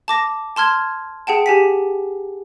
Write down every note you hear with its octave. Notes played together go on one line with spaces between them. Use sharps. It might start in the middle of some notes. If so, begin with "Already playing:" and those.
A5 D6 A#6
A5 C6 F6 G#6
G#4 F#5 G5 A5
G4 G#5 B6